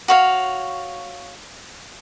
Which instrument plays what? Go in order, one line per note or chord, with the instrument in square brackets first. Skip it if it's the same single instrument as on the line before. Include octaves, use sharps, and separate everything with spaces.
[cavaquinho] F#4 C#5 F5